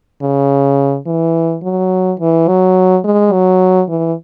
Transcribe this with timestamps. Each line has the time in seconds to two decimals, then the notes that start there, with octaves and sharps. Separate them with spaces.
0.22 C#3
1.06 E3
1.63 F#3
2.20 E3
2.48 F#3
3.04 G#3
3.32 F#3
3.89 E3